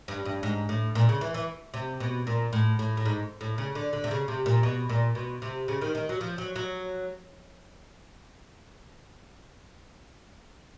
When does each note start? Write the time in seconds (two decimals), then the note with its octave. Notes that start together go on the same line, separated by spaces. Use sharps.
0.08 G2
0.25 G2
0.43 G#2
0.69 A2
0.95 A#2
1.09 C#3
1.21 E3
1.34 E3
1.74 C3
2.00 B2
2.27 A#2
2.53 A2
2.79 A2
2.97 A2
3.05 G#2
3.41 A2
3.58 C#3
3.75 D3
3.93 D3
4.04 C3
4.11 C#3
4.28 C3
4.46 A#2
4.63 B2
4.90 A#2
5.15 B2
5.42 C3
5.68 C#3
5.82 D#3
5.95 D#3
6.09 F#3
6.21 F3
6.38 F#3
6.56 F#3